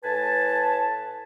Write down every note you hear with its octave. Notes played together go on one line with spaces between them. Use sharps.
A2 B4 G#5 A5